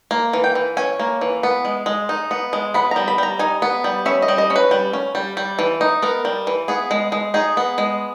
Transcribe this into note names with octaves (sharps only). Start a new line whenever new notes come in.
A#3
E3
G5
E3
C#4 G#5
A#3
E3
B3
G#3
G#3
D#4
B3
G#3
B3 B5
G3 A#5
B5
G3 A#5
D#4 G#5
B3
G3
C#4 E5
D#5
G3
D#5
C#4
B4
G3
C#4
G3
G3
E3
D#4
B3 A#4
G3
E3
B3 G#4
G#3
G#3
D#4 G#4
B3
G#3